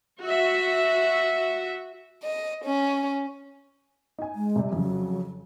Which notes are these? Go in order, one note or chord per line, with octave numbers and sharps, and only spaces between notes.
F#4 E5
D#5
C#4
D#4 G#5
G#3
C3 G3
F2 C#3 F#3